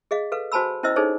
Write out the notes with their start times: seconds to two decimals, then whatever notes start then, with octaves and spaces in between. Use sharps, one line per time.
0.11 G#4 D#5 F5
0.32 A4 B4 F5
0.52 F#4 C5 G#5 A5 B5 E6
0.83 C#4 E4 C5 D#5 E6
0.96 D4 D#4 G#4 A4 C5 C#5